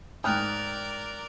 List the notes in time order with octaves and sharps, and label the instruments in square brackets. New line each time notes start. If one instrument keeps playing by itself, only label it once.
[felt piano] G#2 G5 [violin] A#4 D5 [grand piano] D#6 F6 F#6